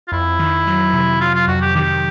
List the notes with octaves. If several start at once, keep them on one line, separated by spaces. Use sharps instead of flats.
F4
F2 E4
D#3
F#3
C3
F#3 F4
F4
F2 F#4
G4
D#3 G4